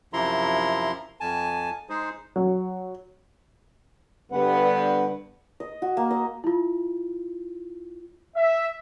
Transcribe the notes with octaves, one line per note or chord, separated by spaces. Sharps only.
F#2 C3 F3 E4 A#5 C6
F2 G#5 A5
G#3 D#4 G#4 C5
F#3
G2 D3 B3 B4 F#5
D#5
F#4
A#3
D#5
E4 F4
E5